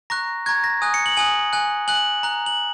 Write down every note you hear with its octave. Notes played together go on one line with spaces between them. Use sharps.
A#5 C#6 F#6 A#6
A#5 C#6 F#6 G#6
A#6
G#5 D#6 F#6
C#7
F#7
G#5 D#6 F#6 F#7
G#5 F#6
G#5 F#6 F#7
A#5 F#6
F#7